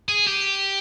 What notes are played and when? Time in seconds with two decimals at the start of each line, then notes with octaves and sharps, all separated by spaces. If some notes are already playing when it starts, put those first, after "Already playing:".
0.08 G#4
0.27 G4